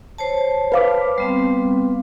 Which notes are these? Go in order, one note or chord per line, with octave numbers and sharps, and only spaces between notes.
C5 C#5 A5
B4 F5 D6
G3 B3 C4